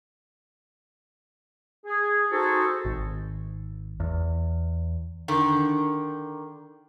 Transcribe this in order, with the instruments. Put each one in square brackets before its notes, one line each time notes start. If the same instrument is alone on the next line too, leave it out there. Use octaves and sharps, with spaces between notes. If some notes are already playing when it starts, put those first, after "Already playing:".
[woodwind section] G#4
D#4 F#4 G#4 A4 C5
[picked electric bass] G#1
E2
[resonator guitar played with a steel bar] D3 D#3